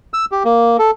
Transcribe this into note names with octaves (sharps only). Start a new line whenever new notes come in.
E6
G4
A#3
A4